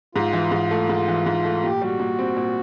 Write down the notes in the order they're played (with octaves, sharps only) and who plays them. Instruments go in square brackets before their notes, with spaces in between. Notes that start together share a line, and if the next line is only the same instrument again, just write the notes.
[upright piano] G#2 [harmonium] F4
[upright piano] E3
G#2
A3
G#2
E3
G#2
A3
[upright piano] A#2 [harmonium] G4
[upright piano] G3 [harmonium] F#4
[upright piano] A#2
C4
A#2